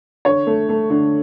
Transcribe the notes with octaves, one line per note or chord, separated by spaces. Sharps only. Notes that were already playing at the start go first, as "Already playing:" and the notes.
D3 C#5
A3
A3
D3